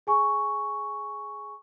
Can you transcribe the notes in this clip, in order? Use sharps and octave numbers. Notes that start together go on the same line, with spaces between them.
G#4 G#5 C#6